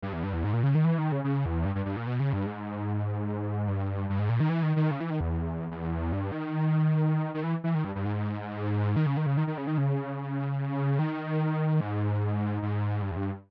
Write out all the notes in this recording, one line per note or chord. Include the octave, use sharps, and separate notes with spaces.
G2
E2
G2
E2
G#2
A#2
C#3
D#3
E3
D#3
C#3
C#3
E2
G2
G2
G2
A#2
B2
C#3
G2
G#2
G2
G2
G#2
A#2
D#3
E3
D#3
D#3
C#3
E3
D#3
E2
E2
G2
D#3
D#3
E3
E3
D#3
G2
G2
G#2
D#3
C#3
D#3
C#3
D#3
D#3
C#3
D#3
C#3
D#3
G#2
G#2
G2
E2
G2